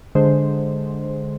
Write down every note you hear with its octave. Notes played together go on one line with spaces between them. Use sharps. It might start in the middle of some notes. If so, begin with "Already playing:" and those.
D3 G#3 C5